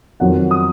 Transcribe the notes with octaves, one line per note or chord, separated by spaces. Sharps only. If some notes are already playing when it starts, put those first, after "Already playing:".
F2 D#3 F#3 F#5
D#6